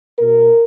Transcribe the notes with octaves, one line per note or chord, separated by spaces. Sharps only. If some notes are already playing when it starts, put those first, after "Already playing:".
B2 A#4